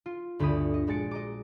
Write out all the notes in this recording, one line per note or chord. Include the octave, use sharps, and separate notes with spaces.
F4
G1 D2 D3 G4 B5 D#6
D#5
A#1 G#3 F#4 A6 C#7 D7
D#5 A#5 D6